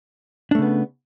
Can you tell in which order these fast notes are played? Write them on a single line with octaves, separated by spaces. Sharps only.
D4 A3 C#3 B3